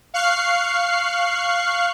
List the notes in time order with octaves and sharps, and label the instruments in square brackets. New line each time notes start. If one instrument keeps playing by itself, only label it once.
[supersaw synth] F5 C#6 F6 F#6 C7